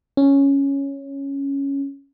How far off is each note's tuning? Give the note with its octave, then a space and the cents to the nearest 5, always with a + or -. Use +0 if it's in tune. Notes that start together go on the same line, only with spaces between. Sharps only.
C#4 +0